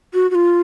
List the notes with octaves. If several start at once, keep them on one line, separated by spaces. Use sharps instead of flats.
F#4
F#4
F4